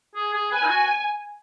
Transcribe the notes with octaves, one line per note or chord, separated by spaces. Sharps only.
G#4
G#4
B4 G#5
D#4
F#4